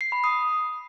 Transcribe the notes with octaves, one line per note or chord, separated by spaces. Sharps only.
C7
B5
D#6